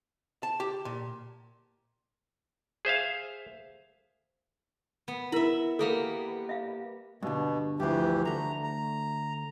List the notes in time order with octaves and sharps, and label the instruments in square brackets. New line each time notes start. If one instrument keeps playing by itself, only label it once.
[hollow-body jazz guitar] A5
G4
A#2
[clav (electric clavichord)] G#4 C5 E5 F5
[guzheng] B3
[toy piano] E4 A#4 [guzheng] E5 B5
[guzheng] G3 A#3 B3 [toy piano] A4
[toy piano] E5 F5
[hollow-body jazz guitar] G2 D3 [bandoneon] B2
[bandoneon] D2 E3 G4 [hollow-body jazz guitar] G2 F3
[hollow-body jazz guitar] D2 A3 [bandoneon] A#5
[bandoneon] A#5